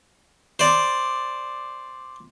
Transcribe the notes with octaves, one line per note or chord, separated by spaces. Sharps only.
C5 D5